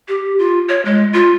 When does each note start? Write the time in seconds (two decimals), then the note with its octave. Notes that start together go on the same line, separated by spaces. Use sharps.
0.08 G4
0.39 F4
0.69 C#5
0.85 G#3
1.13 F4